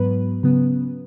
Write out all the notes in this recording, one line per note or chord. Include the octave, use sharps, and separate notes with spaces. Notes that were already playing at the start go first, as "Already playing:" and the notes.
Already playing: G#2 F#3 B3 B4
C#3 F#3 B3